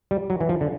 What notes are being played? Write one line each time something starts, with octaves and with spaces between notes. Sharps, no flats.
G3
F#3
E3
F3
D3